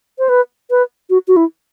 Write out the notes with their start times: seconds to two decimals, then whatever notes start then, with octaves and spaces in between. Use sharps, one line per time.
0.19 C5
0.29 B4
0.70 B4
1.10 F#4
1.28 F#4
1.36 E4